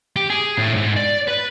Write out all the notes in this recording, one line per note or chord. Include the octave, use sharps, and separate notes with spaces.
G4
G#4
A2
G#2
D5
B4